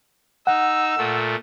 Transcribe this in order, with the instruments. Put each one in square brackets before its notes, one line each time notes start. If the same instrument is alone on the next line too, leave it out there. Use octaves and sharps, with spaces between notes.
[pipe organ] D#4 [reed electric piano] F#5 [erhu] E6
[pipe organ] A#2 A3